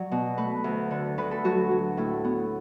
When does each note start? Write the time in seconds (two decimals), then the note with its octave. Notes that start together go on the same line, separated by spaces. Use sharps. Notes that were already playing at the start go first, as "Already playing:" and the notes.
Already playing: F#3 D5
0.11 B2
0.38 A3 B4
0.64 D2
0.91 D3
1.18 D2 B4
1.31 A4
1.44 F#3 F#4
1.71 F#3
1.97 A2 E4
2.24 B3